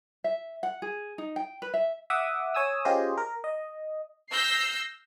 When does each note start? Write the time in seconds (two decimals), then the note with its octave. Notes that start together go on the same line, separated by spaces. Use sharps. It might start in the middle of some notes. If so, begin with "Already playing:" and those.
0.24 E5
0.63 F#5
0.82 G#4
1.18 D#4
1.36 G5
1.62 B4
1.74 E5
2.10 E5 F#5 D6 D#6
2.54 C#5 G#5 D#6 E6
2.85 C#4 F4 G4 G#4 C5 D#5
3.17 A#4
3.44 D#5
4.31 E6 F6 G6 A#6 C7